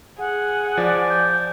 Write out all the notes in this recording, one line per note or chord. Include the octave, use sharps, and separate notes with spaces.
G#4 F#5
F3 D5
G6